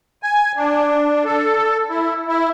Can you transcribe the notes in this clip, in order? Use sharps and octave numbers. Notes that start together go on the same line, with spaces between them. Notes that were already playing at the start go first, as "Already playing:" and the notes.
G#5
D4
A4
E4
E4